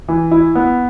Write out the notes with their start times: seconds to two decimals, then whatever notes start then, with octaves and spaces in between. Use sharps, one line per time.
0.08 E3
0.31 E4
0.55 B3